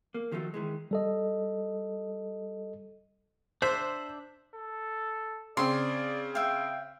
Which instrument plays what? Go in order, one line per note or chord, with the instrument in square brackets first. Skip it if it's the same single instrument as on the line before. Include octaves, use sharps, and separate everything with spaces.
[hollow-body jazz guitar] A#3
D#3 F3 F#3 A3 C#4 D#4
D#3 E3 G#3
[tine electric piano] G3 A4 D#5
[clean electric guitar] D4 E5 [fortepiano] C5
[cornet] A4
[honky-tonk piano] C#3 C4 [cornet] D5 [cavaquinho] C6
[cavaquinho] E5 F5 [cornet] G5